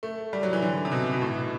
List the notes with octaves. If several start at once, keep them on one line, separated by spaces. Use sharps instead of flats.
A3
G3
F#3
E3
D3
C3
B2
B2
A2
B2